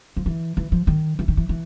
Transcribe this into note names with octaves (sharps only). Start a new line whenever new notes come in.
F3
E3
E3
F3
D#3
E3
D#3
E3
E3